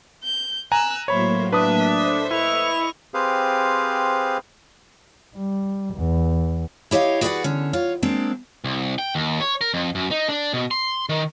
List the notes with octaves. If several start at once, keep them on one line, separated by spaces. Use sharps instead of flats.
G6
G#5 A#5 E6 F#6
A2 F#3 A#3 C5 C#5 E5 B5
D4 B4 E5 D#6
A4 C5
E4 D#5 C#6 F7
C4 G4 G#4 B4 C5 F5
G3
E2
E4 G4 C#5 D#5 F5
F#4 G#4 B4 C#5 D5 F#5
D3 C#4
F4 C#5
F#3 G#3 A#3 C4 D4
C2
G5
D#2
C#5
A#4
F2
F#2
D#4
D4
B2
C6
D#3